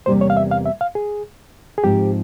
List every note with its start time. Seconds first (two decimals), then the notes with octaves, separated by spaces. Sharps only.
0.06 E2 C3 E3 G3 A#3 C5
0.21 C#5
0.30 F5
0.37 E5
0.51 F5
0.66 E5
0.81 F5
0.95 G#4
1.78 G#4
1.84 G#2 F3 C4 G4